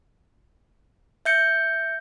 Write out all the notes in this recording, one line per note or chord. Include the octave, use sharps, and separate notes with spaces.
E5 G6 C#7